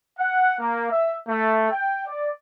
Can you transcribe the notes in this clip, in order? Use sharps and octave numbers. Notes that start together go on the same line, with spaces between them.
F#5
A#3
E5
A3
G5
D5